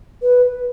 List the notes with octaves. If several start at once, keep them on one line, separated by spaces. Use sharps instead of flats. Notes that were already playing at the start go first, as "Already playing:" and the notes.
B4